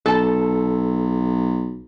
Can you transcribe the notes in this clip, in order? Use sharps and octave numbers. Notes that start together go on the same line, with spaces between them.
B1 A4 A5